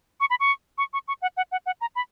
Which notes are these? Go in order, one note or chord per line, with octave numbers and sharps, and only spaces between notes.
C#6
B5
C#6
C#6
C#6
C#6
F#5
F#5
F#5
F#5
A#5
B5